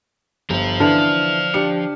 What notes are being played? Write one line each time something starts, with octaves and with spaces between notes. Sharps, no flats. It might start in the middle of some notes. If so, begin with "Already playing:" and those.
G1 F3 F4
D3 E3 F6
D4 G4 C#7